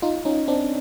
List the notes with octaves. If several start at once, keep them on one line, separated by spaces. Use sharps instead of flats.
D#4 F4
C#4 D#4
C4 D4